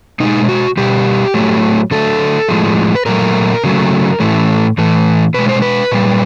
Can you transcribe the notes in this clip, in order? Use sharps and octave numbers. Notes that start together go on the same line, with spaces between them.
B2 G#3 D#4
F#4
B2 G3 G4
A2 F#3 A3
D3 F#3 A3 A4
A2 F3 G#3
B4
A#2 F#3 A3 A#4
C#3 F#3 A3
A2 E3 A3
A2 E3 A3
B2 G#3 B4
C5
B4
A#2 G3